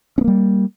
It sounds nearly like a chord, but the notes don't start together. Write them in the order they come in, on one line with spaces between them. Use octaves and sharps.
C#4 B3 A#3 G3